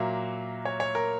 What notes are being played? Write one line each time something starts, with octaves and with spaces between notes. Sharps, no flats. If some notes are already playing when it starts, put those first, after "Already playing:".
Already playing: A#2 F#3 A#3 E5
C#5
C#5
A#4